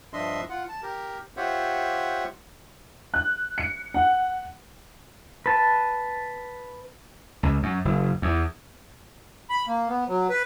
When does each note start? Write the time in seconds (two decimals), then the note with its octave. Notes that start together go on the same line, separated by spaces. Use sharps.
0.13 G2 F3 D4 D#5 E5 C6
0.49 F4 F#5
0.69 A5
0.83 G4 A#4
1.37 F4 G4 C5 C#5 E5 F#5
3.14 F#6
3.58 C#7
3.94 F#5
5.46 B4 A5
7.43 C#2
7.63 F#2
7.85 F#1
8.22 E2
9.50 B5
9.67 A#3
9.89 B3
10.08 F#3
10.30 B4